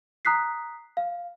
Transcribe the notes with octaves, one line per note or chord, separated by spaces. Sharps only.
A#5 D#6 F#6 B6 C7
F5